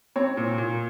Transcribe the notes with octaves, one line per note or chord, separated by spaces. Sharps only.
C4 C#5
A#2
A#2